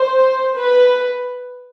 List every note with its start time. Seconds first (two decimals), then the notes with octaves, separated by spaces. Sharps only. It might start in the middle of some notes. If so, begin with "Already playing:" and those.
Already playing: C5
0.55 B4